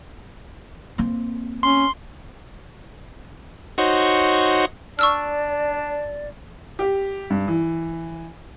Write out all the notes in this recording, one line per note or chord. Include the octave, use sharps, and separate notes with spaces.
A#3 C4
C#4 C6
D#4 F#4 C5 C#5
D4 D5 C#6 E6 F6
G4
G2
E3